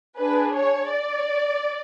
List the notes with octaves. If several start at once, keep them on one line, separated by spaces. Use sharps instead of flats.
D4 G#4 B4
C#5
D5